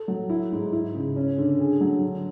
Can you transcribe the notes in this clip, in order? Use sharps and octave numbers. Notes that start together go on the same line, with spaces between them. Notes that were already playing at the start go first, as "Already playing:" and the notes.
Already playing: A4
F#3
E4
G#2
E4
C#3
C#4
D3
G#4
F#3
D3